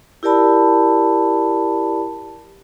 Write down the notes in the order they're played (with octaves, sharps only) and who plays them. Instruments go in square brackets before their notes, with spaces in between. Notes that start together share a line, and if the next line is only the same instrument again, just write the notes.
[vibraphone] E4 G4 A#4 D5 A5 B5